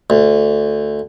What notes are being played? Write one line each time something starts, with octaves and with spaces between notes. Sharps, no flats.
D2